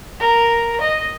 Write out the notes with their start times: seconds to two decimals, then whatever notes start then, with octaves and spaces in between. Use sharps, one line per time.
0.19 A#4
0.80 D#5